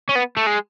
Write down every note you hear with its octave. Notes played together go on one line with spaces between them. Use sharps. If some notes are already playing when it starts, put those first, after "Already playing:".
C#4
B3
A3
G#3